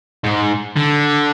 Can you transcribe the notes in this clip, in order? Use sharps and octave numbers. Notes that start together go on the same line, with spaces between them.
G#2
D3